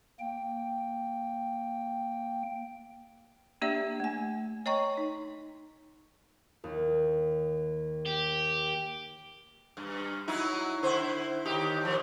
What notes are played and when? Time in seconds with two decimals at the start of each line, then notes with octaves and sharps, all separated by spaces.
0.20 A#3 G5
3.62 A#3 D4 G4 D5 E5
4.00 A3 G#5
4.66 C#5 D#5 G5 A#5 C#6
4.97 D#4
6.64 D#2
8.06 G4
9.77 G2
10.28 F#3 D#4 E4
10.83 D3 E4 C5
11.45 D#2 D#4 G4
11.85 A#2 F3